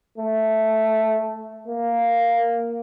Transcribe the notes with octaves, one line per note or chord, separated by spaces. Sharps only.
A3
A#3